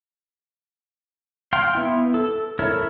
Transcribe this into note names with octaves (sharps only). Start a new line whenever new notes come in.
F5 G5 C6
B3 E4
A4
E4 A4 A#4 C#5 E5